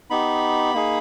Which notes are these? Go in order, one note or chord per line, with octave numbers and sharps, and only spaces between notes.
B3 D#4 G4 B5
A#3 D#4 G#4